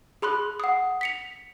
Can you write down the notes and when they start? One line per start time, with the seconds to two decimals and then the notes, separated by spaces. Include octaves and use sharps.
0.22 G#4 B5 C6 F#6
0.60 F#5 D#6
1.01 B6 C#7 F7